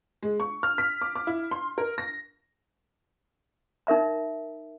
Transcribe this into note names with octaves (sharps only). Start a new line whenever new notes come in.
G#3
C#6
F6
B6
D6
D6
E4
C6
A#4
A#6
D#4 A#4 E5 A#5